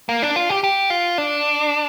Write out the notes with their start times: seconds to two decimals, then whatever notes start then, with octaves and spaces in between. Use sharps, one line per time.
0.09 A#3
0.22 D4
0.36 F4
0.49 G4
0.64 G4
0.90 F4
1.18 D4